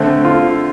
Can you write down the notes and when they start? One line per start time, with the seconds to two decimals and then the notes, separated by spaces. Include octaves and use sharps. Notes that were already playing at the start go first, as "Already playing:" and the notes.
Already playing: D3 A3 C4
0.25 F4